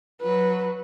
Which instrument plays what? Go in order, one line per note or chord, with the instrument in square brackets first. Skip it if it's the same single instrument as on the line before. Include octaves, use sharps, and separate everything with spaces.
[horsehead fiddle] F#3 B4